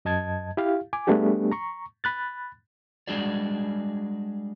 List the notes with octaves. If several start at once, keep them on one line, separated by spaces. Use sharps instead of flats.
F#2 D#5 A5 G#6
E4 G4 F5
G#5 D6
G3 A3 B3 D4 G4 G#4
A#5 C#6
B5 F#6 A6
G3 G#3 D4 F#4 G#4 D5